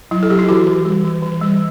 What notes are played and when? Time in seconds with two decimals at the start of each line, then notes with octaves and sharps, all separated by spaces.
0.11 F#3 E4
0.23 A4
0.30 F#3 G4
0.39 E4
0.49 E3 F#4
0.67 E3
0.85 G3
1.05 E3
1.22 E3
1.42 G3